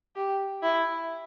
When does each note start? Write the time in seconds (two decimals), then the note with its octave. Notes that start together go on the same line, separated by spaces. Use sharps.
0.16 G4
0.63 E4